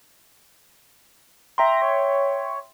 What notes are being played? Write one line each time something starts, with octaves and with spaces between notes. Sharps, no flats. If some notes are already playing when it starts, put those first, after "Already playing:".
E5 G5 A#5 C6
C#5